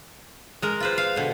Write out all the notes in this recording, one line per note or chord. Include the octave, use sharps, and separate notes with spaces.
G#3 A#4
F4 B4 C5
F5
B2 D3